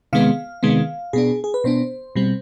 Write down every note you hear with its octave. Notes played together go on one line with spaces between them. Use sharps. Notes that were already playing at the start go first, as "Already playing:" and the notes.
C3 D#3 G#3 B3 F5
C3 D#3 G#3 B3
B2 B3 D4 G#4
G#4
B4
B2 B3 D4 C5
B2 G3 C4